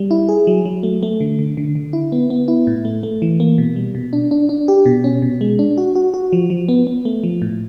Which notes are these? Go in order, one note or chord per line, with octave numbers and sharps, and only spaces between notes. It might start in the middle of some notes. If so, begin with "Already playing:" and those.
Already playing: G3
E4
G#4
F#3
F#3
A3
A3
D3
D3
D3
D3
E4
B3
B3
E4
A2
A3
A3
E3
A#3
B2
G3
B2
D4
D4
D4
G4
B2
C#4
B2
G#3
D4
F#4
F#4
F#4
F3
F3
B3
B3
A3
F3
A2